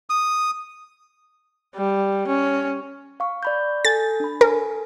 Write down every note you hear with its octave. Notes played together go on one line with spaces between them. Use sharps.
D#6
G3
C#4
F5 C#6
D5 B5 G6
A4 G#5 G6 A6
D4 B5
A4 A#4 G#5